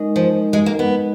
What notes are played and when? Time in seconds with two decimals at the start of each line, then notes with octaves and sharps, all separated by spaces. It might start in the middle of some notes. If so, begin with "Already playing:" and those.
Already playing: G#3 D#4 A#4 D#5
0.16 F3
0.53 G#3
0.66 A#3
0.79 B3